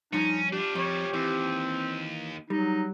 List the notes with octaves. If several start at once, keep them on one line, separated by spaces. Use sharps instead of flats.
G2 F3 C#4 D#4
D4 F4 G4
F2 F3 G3 C#5
D#2 E3 C4
F#3 G3 D#4